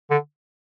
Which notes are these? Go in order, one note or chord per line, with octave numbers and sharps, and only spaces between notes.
D3